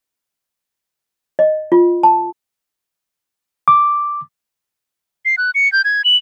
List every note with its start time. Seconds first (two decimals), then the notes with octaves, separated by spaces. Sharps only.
1.39 D#5
1.72 F4
2.03 A5
3.68 D6
5.25 C7
5.38 F#6
5.55 C#7
5.72 G6
5.85 G#6
6.05 F#7